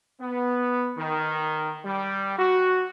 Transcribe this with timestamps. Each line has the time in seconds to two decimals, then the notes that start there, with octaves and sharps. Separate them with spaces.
0.20 B3
0.98 D#3
1.84 G3
2.39 F#4